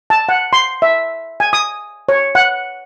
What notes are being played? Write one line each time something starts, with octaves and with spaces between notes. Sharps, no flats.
A5
F#5
C6
E5
G#5
D#6
C#5
F#5